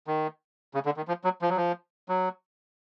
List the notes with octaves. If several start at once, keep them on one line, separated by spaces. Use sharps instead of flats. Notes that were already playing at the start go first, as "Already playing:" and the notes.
D#3
C#3
D3
D#3
F3
F#3
F3
F#3
F3
F#3